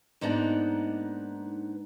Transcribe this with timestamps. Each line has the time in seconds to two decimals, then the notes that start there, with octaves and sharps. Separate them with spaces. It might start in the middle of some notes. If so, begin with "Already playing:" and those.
0.21 G#2 A#3 B3 D4 D#4